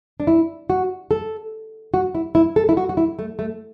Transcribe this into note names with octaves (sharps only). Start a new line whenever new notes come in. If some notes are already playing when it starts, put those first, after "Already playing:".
D4
E4
F#4
A4
F#4
E4
E4
A4
E4
F#4
F#4
E4
A3
A3